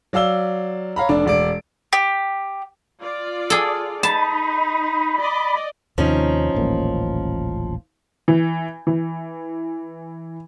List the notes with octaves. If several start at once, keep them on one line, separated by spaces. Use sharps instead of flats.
F#3 D5 F5 E6 G7
C#5 F5 A#5 B5
F1 D4 D5
E1 D5 D7
G4
F4 D5
G#4 A4
D#4 A5 B5
D5 D#5
D#2 C3 F3 C#4 D#4
D#1 A1 A#3
E3
E3